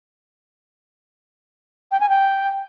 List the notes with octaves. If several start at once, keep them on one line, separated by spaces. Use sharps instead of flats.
G5
G#5
G5